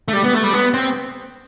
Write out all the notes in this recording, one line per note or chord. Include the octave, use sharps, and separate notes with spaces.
A3
G3
B3
A3
G3
B3
C4